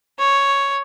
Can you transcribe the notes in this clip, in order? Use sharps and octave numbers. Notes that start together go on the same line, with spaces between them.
C#5